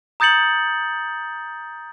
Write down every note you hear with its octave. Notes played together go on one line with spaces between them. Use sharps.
A#5 D#6 G6 A6 C#7 F#7